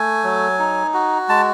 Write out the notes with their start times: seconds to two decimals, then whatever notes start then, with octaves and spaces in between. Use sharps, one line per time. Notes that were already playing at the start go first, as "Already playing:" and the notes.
Already playing: A3 G#5
0.24 F#3
0.59 D#4
0.94 F#4
1.29 G#3 A5